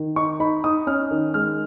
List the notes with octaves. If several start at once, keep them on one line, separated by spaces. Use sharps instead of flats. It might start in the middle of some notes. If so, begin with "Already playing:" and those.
Already playing: D#3
D#4 C#6
D#4 B5
D#4 D#6
C#4 F6
D#3
G#3 F6